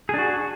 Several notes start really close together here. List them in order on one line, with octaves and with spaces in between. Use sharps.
G#4 D4 F#4